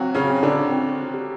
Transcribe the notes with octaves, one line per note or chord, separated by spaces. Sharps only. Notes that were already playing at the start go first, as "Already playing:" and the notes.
Already playing: F#3 C4 F4 F#4
C#3 C#4
C4
D3 D4
C4
G4